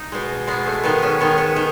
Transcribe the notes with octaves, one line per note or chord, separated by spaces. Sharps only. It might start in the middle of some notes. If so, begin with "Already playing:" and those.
Already playing: D#4
B2 G#3
B2 G#3 B3
A3
D#3 G#3 B3
C#4
D#3 G#3 B3
B3
D#3